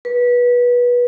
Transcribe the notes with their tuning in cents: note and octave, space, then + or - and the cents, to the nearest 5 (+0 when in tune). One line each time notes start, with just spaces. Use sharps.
B4 -20